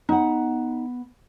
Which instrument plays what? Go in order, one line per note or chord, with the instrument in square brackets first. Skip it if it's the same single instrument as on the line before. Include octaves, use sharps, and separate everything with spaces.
[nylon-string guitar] B3 F#5 [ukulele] D#4